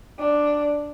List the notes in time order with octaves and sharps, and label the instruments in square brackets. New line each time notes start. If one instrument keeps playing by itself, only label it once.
[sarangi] D4